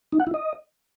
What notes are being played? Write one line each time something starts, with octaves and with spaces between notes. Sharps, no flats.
D#4
F#5
E4
D#5